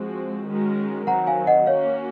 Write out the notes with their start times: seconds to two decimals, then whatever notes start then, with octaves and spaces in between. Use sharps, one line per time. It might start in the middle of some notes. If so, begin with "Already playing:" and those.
Already playing: F3 G#3 C4 F#4
0.48 D#3 G#3 C#4 F#4 A#4
1.07 D#3 F#3 C4 F#5 A#5
1.27 F5 G#5
1.47 D#5 F#5
1.67 A#3 C#4 F#4 C#5 F5